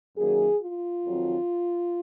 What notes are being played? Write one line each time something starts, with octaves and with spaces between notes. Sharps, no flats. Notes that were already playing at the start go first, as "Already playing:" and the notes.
F#2 D#3 F#3 A#3 G#4
F4
F2 D#3 F#3 C4